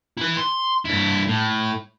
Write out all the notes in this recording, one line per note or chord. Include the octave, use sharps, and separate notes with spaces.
E4 B4
C6
G2 E4
A2